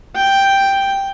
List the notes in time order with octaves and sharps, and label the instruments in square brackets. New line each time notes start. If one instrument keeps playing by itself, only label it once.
[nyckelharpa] G5